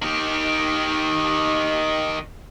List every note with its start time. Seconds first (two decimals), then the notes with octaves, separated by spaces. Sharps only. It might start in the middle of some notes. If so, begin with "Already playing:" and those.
0.02 D#3 G4